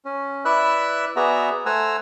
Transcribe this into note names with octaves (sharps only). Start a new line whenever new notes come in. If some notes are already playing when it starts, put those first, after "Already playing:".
C#4
E4 B4 D5 E5 E6 F#6
B3 F#4 G#4 D5 E5 A#5
A3 C5 F#5 G#5 A#5 E6